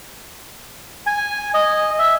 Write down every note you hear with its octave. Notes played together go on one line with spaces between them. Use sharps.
G#5
D#5
E5